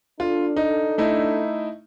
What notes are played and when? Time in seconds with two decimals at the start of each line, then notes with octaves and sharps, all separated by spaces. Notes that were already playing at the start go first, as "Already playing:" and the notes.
0.20 D4 F4 A4
0.57 D#4
0.98 A3 D#4 E4